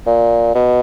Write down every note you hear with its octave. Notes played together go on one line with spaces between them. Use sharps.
A#2
B2